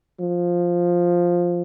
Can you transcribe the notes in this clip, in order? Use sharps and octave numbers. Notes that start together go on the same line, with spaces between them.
F3